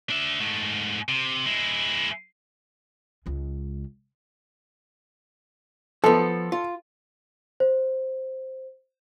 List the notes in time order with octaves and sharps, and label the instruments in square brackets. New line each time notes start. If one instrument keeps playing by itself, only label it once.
[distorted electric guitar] D4 E5
G#2 A3
C3
G#3 E4
[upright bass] C#2 G#3
[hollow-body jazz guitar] F3 B3 [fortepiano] A4
[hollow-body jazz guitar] F4
[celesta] C5